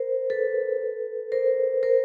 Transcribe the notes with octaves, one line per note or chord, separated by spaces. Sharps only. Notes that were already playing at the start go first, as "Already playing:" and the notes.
Already playing: A#4 C5
A4 B4
A#4 C5
A#4 C5